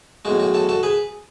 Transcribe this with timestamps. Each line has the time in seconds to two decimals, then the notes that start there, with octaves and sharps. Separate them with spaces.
0.25 B1 A2 G#3 F#4
0.40 F#4
0.54 F#4 A4
0.69 F#4 A4
0.83 G#4 B4